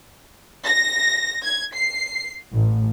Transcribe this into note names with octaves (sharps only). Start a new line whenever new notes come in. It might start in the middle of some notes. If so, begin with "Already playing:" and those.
A#6
G#6
C7
A1